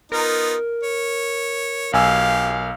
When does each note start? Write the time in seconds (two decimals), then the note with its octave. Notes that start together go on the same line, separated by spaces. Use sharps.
0.12 B3 D#4 F4 A#4
0.83 C#5
1.93 B1 G4 F5 G#5 E6